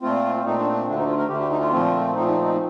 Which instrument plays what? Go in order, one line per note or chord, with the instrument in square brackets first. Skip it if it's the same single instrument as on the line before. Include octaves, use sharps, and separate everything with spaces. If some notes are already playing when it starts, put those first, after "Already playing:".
[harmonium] A#2 A3 C4 F4
A#2 A3 C4 D#4
D4
D4
D2 D3 A3 D4
D#4
F4
A#4
D2 D3 A3 G4
G4
D#4
F4
A#2 F3 A3 C4
A#2 F3 A3 C4 D#4
D#4
D#4